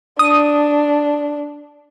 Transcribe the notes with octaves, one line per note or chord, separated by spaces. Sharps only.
D4 D#6